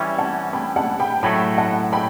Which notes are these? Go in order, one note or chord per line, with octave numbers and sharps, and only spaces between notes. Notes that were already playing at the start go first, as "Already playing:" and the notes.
Already playing: E3 G3 C#4 E5 G5
F#5 A5
G5 B5
F#5 A5
G5 B5
A2 F#3 A3 G5 B5
F#5 A5
G5 B5